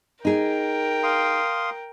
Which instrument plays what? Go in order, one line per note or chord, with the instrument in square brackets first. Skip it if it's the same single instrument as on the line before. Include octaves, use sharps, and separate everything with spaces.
[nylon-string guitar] D#4 G#4 [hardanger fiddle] A#4 G5
[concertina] F5 C6 D#6